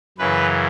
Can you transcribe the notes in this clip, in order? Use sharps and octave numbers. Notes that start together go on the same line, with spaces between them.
F#2 C#3 E3 B4